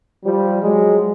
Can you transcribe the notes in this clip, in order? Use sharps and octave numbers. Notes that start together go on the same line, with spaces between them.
F3 G3
F#3 G#3